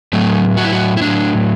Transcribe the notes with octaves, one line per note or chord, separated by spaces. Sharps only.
A2 F#3 A3
F#4
E4
F#4
E4
A2 F#3 D4